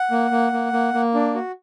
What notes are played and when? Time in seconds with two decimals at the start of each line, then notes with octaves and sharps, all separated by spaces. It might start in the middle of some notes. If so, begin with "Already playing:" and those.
Already playing: F#5
0.11 A#3
0.31 A#3
0.52 A#3
0.73 A#3
0.94 A#3
1.14 D4
1.35 F#4